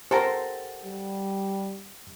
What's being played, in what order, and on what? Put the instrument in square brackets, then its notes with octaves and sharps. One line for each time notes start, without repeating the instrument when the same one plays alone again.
[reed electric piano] G4 F#5 A6 [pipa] A4 A#4 [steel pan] C5
[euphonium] G3